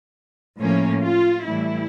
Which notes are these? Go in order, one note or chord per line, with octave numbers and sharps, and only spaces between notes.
A2 F3 A#3 C#4
F4
A2 E3 G3 E4